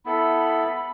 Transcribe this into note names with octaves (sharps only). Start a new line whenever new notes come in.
B3 E4 A4 B5